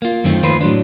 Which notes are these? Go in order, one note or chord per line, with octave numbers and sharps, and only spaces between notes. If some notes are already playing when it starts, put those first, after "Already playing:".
A#3 F4
F#2 D#3 A3 C4 F4
D#2 D#3 F3 F4 B4 C5
A2 F#3 D4